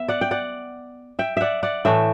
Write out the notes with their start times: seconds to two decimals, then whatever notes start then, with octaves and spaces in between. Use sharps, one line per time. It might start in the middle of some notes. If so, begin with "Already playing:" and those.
Already playing: B3 E5
0.08 D5 F#5
0.21 G5
0.31 D5 F#5
1.19 E5 G5
1.37 D5 E5 F#5
1.63 D5 F#5
1.85 A2 E3 A3 E5 G5